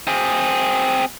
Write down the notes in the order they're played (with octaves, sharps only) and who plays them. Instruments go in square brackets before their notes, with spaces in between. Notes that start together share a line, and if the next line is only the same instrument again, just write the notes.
[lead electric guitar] C4 G#4